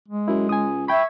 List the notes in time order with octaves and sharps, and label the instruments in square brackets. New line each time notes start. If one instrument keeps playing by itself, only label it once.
[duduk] G#3
[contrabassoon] F#2 [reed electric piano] E4
[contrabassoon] C#2 [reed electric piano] G#5 D#6
[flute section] E5 C#6 G#6 [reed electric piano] G5 B5